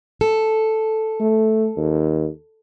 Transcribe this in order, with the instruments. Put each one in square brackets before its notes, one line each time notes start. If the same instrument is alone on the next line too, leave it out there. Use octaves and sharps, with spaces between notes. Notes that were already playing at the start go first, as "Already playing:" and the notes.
[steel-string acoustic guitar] A4
[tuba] A3
D#2